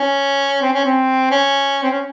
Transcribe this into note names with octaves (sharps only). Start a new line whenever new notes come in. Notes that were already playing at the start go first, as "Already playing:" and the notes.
Already playing: C#4
C4
C#4
C4
C#4
C4
C#4